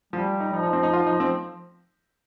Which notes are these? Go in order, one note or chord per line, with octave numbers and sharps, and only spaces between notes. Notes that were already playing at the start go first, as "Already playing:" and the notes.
F3 G3
D#4
F3 D#4
D#4
C4
D#4
F4
D#4
C4